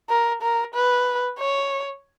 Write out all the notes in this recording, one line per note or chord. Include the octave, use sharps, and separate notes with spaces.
A#4
A#4
B4
C#5